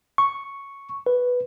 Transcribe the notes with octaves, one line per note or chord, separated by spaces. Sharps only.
C#6
B4